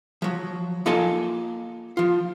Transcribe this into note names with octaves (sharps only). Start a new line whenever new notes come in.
F3 F#3
A#3 F4 A4 D#5 G#5 A5
F3 F4